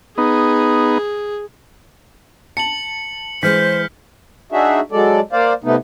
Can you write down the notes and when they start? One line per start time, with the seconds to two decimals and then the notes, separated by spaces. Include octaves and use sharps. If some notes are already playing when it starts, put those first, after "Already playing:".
0.18 B3 D#4 G#4
2.57 A5 C#7 F#7
3.43 E3 G#3 C5 F6 G6 B6
4.52 D4 D#4 F#4 G#4 E5
4.92 F#3 G#3 A4 D5
5.32 A#3 C5 D5 F5
5.64 C3 A3 B3 D#4